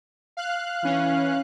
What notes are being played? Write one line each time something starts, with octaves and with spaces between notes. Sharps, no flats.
F5 F#6
E3 C#4